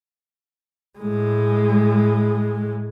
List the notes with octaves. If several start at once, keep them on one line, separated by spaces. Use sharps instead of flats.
A2 G#3